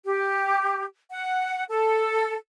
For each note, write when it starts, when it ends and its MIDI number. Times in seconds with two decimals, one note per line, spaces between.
0.05 0.83 67
1.11 1.63 78
1.70 2.35 69